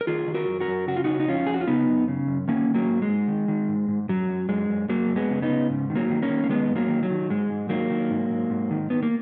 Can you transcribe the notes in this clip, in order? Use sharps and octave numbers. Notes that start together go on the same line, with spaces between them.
A#4
D#3 F4 G#4
D#3
F#4 A#4
F#2
F#4 A#4
F#2
C#3 F#4
F4
C#3 D#4 F#4
D#4
F2 C#4 F4
F2 G#4
F#4
F4
C#3 B3 D#4
F#2
C#3
F#2
D#3 A#3 C#4
D#3
F#3 A#3
G#2
G#3
G#2
D#3
D#3
G#2
G#2
F#2 F#3
F#2
F#2 G#3
F#2
F#2 F#3 A#3
F#2
G#3 B3
C#3
B3 D#4
C#3
G#2
D#3
F#3 A#3
D#3
A#3 C#4
D#3
A#3
D#3 G#3 B3
G#2
F#3 A#3
D#3
F#3
D#3
G#2 G#3
G#2
D#3 F#3 A#3
D#3
G#2
G#2
G#2
D#3
D#3 B3
A#3